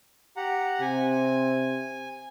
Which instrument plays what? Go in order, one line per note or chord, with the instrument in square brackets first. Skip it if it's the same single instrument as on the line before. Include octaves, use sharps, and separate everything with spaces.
[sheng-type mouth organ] G4 F#5 A#5
[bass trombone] C3 [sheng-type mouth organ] G#5